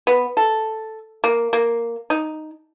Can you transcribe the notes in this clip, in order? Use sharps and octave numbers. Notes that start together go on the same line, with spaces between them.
B3
A4
A#3
A#3
D#4